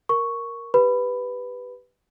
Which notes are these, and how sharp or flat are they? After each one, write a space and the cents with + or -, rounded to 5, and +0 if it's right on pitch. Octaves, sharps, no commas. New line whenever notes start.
A#4 +0 C#6 +0
G4 +0 B4 +0 B5 +10